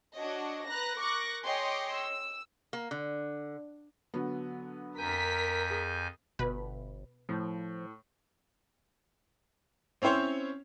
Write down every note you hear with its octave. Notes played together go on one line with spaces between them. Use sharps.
D4 F#4 C#5 D#5
B4 A#5 F#6 A#6
A#4 C#6 D6 F#6 A#6
G#4 C#5 D#5 G5 C6 D6
E6
A#3
D3
D3 F#3 B3
F2 A#4 G#5 G6 B6
G#4
G1 B2 B4 B5
A2 F3
C4 C#4 E4 C5 C#5